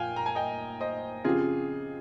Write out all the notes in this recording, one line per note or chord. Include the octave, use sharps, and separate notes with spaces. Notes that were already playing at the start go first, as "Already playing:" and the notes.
Already playing: A#2 F3 F5 G5 G#5
A#5
G#5
D#5 G5
C5 D#5
C#3 F3 C4 F4 G4 G#4